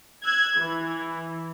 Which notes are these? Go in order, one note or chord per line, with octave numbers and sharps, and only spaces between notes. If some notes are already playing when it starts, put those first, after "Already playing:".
E6 F#6 G#6
E3